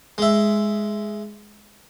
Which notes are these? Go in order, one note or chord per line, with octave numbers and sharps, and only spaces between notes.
G#3 E5